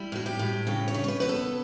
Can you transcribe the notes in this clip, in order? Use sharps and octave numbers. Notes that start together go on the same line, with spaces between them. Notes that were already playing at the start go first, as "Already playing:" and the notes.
Already playing: G3 E4
A2 F#4
G4
A2
C#3 A4
C#5
C#3
C#5
B4
B3 B4
A4